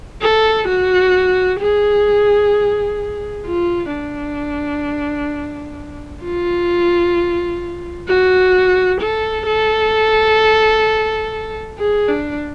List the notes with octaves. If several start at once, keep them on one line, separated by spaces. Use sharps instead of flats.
A4
F#4
G#4
F4
D4
F4
F#4
A4
A4
G#4
D4